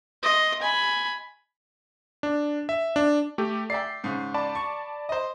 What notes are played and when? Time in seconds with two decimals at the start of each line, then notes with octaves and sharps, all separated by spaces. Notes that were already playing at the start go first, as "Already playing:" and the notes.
0.23 D#5 C6
0.62 G#5 B5
2.23 D4
2.69 E5
2.96 D4
3.38 A3 G4
3.70 D5 E5 G5 C7
4.04 G#2 C#3
4.34 D5 A5 B5
4.55 C#6
5.09 C5 D#5